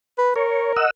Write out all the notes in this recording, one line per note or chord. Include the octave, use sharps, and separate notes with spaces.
B4
A#4 C#5
D#5 F#5 E6